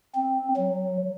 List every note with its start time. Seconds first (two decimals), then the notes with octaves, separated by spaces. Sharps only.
0.15 C4
0.57 F#3